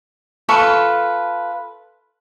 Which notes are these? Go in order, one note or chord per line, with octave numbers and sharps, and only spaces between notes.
F4 A4 B4 C#6